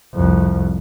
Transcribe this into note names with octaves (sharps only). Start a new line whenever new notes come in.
C2 F2